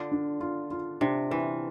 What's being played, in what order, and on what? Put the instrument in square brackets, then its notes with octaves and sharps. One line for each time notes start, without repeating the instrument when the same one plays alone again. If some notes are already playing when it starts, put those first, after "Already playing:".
Already playing: [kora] D3 [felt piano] F4
[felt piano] D4
F4
F4
[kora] C3 [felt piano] D4
[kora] E3 [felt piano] B4